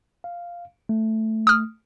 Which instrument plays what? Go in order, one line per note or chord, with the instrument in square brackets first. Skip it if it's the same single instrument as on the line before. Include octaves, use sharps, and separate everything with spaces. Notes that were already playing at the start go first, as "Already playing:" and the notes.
[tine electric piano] F5
A3
[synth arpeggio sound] D#6 F6